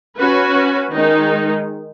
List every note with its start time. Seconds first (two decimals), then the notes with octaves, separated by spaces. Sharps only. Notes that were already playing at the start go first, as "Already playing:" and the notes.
0.17 C#4 F#4 B4
0.91 D#3 G#3 D#4